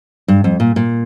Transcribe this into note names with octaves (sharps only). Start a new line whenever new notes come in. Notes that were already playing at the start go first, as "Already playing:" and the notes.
G2
F2
A#2
A#2